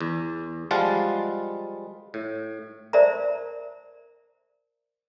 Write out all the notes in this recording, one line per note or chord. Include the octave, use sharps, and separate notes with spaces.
E2
F3 G3 G#3 F4 F#5 A5
A2
A#4 C5 D5 E5 A5 A#5